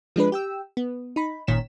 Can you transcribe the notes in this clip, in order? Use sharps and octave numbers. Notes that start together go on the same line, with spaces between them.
F3 G#3 D4 B4
G4 G5 E6
B3
D#4 B5
G1 A#2 D#3 C#4 B6 E7